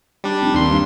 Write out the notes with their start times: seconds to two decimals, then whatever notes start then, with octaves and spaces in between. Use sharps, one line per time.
0.24 G3 D4
0.41 F1
0.54 D#2 C6
0.70 G2